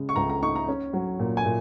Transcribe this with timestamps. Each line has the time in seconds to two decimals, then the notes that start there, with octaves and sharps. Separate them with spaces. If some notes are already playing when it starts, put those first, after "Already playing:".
Already playing: C#3 G#3
0.09 C#6
0.16 C#2 A#5
0.29 A#5
0.42 D#4 C#6
0.56 A#5
0.68 C#4
0.93 F#3
1.19 A#2
1.37 G#5
1.45 A#2